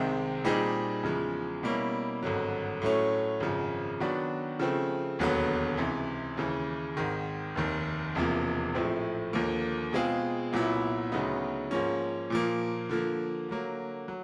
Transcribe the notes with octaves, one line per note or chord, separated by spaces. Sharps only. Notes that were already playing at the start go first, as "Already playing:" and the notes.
Already playing: C2 C3 D#3 G#3 C4
A#2 G3 C4 D#4 G#4
E2 C#3 F3 G#3
B2 G3 A#3 C#4 E4
G#1 G2 D3 F#3
A2 F#3 A3 C#4
G#1 F#2 C#3 F3
D#3 F#3 B3 D4 F#4
C#3 F3 A3 C4
E1 D#2 D3 F#3 B3
C#2 C3 E3
D#2 C#3 E3
G#1 G#2 D#3
F1 D#2 D#3
E1 E2 C3 F3 A#3
A#1 A2 F3 A3 C4
D#2 D3 F3 A#3
B2 G#3 C4 F4 G#4
C2 A#2 F#3 B3 E4
D2 C#3 F#3 B3 D#4
G#2 F3 A#3 C#4
A#2 F3 A#3
D3 F3 A#3
D3 F#3 A#3
F#3